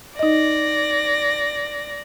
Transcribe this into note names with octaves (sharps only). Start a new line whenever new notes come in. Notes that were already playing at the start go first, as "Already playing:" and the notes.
D#4 D5 D#5 A#6